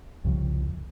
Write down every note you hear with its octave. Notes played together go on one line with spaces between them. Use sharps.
C2 F2 C#3 F3